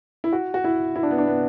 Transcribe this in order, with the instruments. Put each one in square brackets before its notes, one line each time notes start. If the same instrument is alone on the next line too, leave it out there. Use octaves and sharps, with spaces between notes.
[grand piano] E4
F#4
F#4
E4
E4
D4
B3
D4
B3